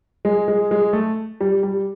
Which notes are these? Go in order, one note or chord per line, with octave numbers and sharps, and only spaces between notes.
G#3
G#3
G#3
A3
G3
G3